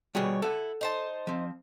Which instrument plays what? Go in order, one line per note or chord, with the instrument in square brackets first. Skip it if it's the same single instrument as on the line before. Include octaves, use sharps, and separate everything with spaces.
[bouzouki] B2 C#5 [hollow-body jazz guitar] G3 F#4 G#4
[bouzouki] E4 [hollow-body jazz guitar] A4 F#5
[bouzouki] D#4 C5 A5
[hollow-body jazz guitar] F3 C4